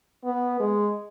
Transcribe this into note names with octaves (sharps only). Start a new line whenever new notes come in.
B3
G#3